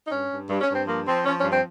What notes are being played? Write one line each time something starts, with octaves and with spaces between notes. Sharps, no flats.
D#4
G2 C#4
G2
G2
C#4
G2
C4
F3 A#3
F3 C4
F3 C#4
C#4
G2
C4